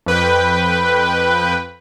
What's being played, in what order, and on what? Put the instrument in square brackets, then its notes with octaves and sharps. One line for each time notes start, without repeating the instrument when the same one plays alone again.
[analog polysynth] F2 B4 G5